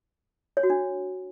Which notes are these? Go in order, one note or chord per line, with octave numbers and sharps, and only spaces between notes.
C#5
F#4
D4